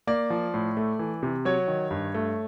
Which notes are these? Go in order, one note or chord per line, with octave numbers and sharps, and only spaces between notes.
A#3 D5
F3
A2
A3
E3
C3
F#3 C#5
D#3
G2
A3